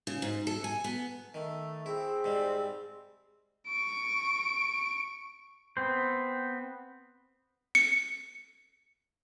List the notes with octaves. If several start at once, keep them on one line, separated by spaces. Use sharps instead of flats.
C#3
G#2
A4
G#5
B3
D#3 A3
C4 E4 G#4
G#2 G3
C#6 D7
B3 C4 C5
C#7